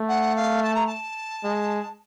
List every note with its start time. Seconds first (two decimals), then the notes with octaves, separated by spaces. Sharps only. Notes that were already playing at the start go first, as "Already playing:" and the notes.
Already playing: A3
0.08 F#5
0.36 F5
0.62 A5
0.74 A#5
0.86 A5
1.44 G#3